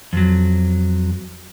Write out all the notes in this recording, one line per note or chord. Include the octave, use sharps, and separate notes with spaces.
F2 F#3